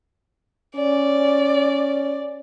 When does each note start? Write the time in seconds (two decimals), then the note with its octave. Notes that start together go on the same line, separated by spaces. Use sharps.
0.76 C#4 D5